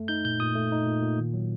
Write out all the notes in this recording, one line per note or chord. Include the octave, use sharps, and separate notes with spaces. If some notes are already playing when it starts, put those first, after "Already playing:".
Already playing: F#2 A3
D#4 G6
A#2 G6
A#2 D#6
A3
D#4
A#2
A#2
D#3
F#3